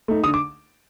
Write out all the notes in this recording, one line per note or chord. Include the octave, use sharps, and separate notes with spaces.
A3 D#4
D3 D#6
D6